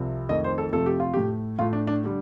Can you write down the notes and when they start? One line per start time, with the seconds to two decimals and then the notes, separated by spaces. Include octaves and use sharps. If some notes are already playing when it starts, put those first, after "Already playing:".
Already playing: C2 C3 F3
0.29 F2 D#3 A3 D#5
0.44 C5
0.58 A4
0.72 F2 C3 F3 A3 A4
0.86 G4
1.00 F4
1.14 A2 A3 G4
1.59 A2 A3 F4
1.73 D4
1.87 D4
2.04 D3 G3